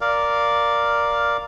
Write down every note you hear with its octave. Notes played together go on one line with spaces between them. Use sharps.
A#4 D5 F5